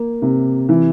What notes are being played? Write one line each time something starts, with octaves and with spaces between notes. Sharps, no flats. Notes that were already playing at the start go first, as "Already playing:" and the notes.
Already playing: A#3
C3
E3